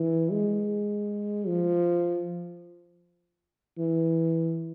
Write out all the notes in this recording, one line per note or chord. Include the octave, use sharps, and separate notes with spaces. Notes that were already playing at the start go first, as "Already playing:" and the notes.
Already playing: E3
G#3
F3
E3